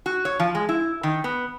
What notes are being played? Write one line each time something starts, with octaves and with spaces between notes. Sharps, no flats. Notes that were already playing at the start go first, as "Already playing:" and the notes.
F#4
C#5
F3
G#3
E4
D#3
B3